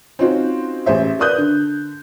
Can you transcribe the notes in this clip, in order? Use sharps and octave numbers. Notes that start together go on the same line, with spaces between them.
C4 C#4 D#4 F4 F#4 C5
A1 G#4 C5 E5
A#4 B4 D5 D#6 F#6 G6
D3